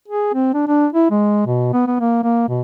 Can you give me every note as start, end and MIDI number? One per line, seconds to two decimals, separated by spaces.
0.08 0.31 68
0.33 0.48 60
0.53 0.66 62
0.67 0.87 62
0.92 1.09 64
1.10 1.45 56
1.46 1.70 47
1.73 1.83 59
1.87 1.97 59
2.00 2.18 58
2.24 2.47 58
2.48 2.62 47